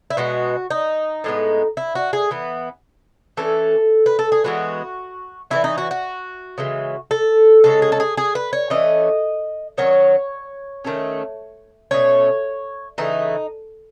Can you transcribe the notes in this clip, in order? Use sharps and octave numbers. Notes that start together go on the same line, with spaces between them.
E4
B2 G#3 B3 F#4
D#4
A2 G#3 B3
E4
F#4
G#4
E3 B3
E3 A3 C#4 A4
B4
A4
G#4
E3 G#3 B3 F#4
E3 G#3 C#4 E4
D#4
F#4
F#4
C#3 E3 G#3
A4
C#3 G#3 C#4 A4
G#4
A4
G#4
G#4
B4
C#5
E3 A3 C#4 D#5
D#3 F#3 C#4 C#5
D#3 A3 C#4
B2 A3 C#4 C#5
C#3 E3 A3 D#4